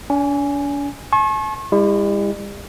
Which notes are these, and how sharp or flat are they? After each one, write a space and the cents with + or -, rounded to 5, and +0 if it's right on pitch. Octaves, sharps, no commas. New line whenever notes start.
D4 -45 G#5 +0
A5 -45 C#6 -40
G3 +45 E4 +0